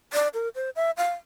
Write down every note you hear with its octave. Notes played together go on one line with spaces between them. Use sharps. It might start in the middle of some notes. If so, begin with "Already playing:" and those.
D5
A#4
C5
E5
F5